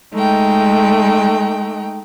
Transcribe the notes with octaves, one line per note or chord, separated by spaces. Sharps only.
G#3 A3 D#4 G5